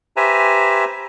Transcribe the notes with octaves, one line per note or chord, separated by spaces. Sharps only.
G4 B4 C5 E5 G#5 A#5